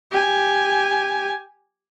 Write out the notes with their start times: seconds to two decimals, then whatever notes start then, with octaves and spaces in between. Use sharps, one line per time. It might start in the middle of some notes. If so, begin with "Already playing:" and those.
0.11 G4 G#5